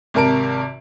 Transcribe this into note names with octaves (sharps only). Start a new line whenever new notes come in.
G#1 C3 A#4 A5 D7